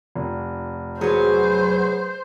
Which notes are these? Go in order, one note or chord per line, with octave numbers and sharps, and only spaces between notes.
F1
F#3 G#4 B4 C5